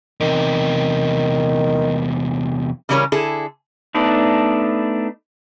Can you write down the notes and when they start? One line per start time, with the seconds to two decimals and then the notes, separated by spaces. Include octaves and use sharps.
0.20 E2 C3 D#3
2.89 C#3 E3 G3 C#4 A#4 C#5
3.12 D3 E4 G#4 A4
3.95 A3 B3 D4 D#4